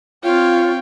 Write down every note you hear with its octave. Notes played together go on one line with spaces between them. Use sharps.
C4 F4 C#5 F5 G5